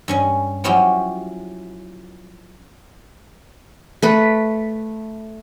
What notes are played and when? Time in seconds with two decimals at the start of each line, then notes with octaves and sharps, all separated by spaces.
0.08 G2 C#4 G#5
0.64 F3 F#3 C#4 E4 F#4 G4
4.02 A3 B4